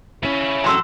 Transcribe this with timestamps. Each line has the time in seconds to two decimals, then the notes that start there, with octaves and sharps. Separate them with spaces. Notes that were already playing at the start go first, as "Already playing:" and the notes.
0.23 C#3 C#4 E4 B5
0.64 A2 F#3 A4 A#5 C6 E6